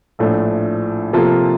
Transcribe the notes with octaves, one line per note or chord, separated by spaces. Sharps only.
A#1 A2 F3 A3 D4
C3 F3 A#3 F4 A4